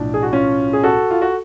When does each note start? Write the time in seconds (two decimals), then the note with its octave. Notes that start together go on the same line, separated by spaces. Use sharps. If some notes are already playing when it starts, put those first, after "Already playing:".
Already playing: B1 A2 F3 D4
0.14 G#4
0.23 F#4
0.32 C#4 F4
0.73 G#4
0.83 F#4 A4
1.11 F4
1.22 F#4